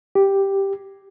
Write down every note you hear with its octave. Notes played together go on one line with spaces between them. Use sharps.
G4